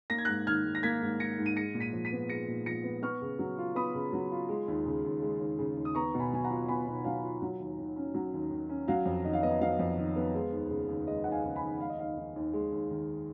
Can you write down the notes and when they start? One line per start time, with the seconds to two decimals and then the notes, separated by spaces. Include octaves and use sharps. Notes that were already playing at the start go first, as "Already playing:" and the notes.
0.10 A#3 A#6
0.18 G#6
0.25 G#2 F#6 A#6
0.47 D#3 F6 G#6
0.65 G#2
0.75 A#6
0.83 A#3 G#6 B6
1.02 G#2
1.20 D#3 A#6 C#7
1.38 G#2
1.46 D#7
1.56 G#3 A#6 C#7
1.74 A#2
1.80 B6 D#7
1.93 F3
2.05 B6 D#7
2.12 B3
2.29 G#3 A#6 C#7
2.48 A#2
2.66 F3 A#6 C#7
2.84 B3
3.02 B3 C#6 F6
3.22 C#3
3.39 F#3
3.58 F4
3.75 B3 B5 D#6
3.95 C#3
4.13 F#3
4.31 F4
4.49 G#3
4.68 D#2
4.86 C#3
5.05 D#2
5.22 G#3
5.40 D#2
5.59 C#3
5.77 D#2
5.85 D#6
5.95 B3 A#5 C#6
6.14 B2
6.19 G#5 B5
6.32 F#3 G#5
6.44 F#5 A#5
6.50 F4
6.68 B3 G#5 B5
6.87 B2
7.04 F#3 F5 G#5
7.23 F4
7.42 F#3
7.59 D#2
7.79 D#3
7.96 C#4
8.14 F#3
8.33 D#2
8.51 D#3
8.69 C#4
8.88 F#3 F5
9.06 F2
9.24 D#3 D#5
9.33 F5
9.43 B3 D#5
9.61 F#3 F5
9.79 F2
9.97 D#3
10.16 B3
10.35 G#3
10.52 D#2
10.70 C#3
10.89 D#2
11.07 G#3 D#5
11.24 D#2 F#5
11.32 F5 G#5
11.45 C#3
11.56 G#5 B5
11.63 D#2
11.80 G#3 F5
11.90 D#5
11.99 D#2 F5
12.17 D#3
12.36 D#2
12.53 G#3
12.72 D#2
12.90 D#3